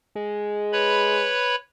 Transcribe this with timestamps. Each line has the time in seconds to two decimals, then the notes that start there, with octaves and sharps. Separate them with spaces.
0.15 G#3
0.72 B4 C#5 B5